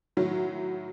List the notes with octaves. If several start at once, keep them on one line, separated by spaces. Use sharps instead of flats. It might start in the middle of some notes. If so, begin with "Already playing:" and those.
A2 D#3 F#3